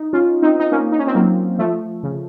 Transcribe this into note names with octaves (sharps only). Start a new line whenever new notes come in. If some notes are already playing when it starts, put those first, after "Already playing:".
Already playing: D#4
C#4 F4
C4 D#4
D#4
A#3 C#4
D#4
C#4
C4
F#3 A#3
F3 A3
C#3